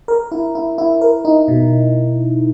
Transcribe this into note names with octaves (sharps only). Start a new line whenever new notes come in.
A#4
E4
E4
E4
A#4
D#4
B2